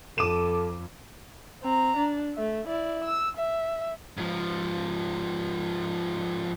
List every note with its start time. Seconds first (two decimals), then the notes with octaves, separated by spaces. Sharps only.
0.18 F2 A4 D6 D#7 E7
1.63 C4 A#5
1.97 D4
2.35 A3 E5
2.67 E4 D5
3.04 E6
3.37 E5
4.17 G#2 F3